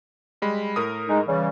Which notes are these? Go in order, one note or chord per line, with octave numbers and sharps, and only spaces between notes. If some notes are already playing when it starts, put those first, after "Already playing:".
G3 G#3 B5
A2 A#4 D#6
G#3 D#4
C#3 E3 G3